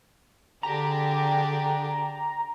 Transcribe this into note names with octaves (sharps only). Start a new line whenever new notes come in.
D3 D4 G4 G#4 A#5